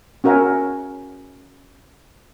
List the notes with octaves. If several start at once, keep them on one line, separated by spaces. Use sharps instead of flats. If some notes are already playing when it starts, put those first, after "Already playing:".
C#4 F#4 A#4 E5 F#5 G#5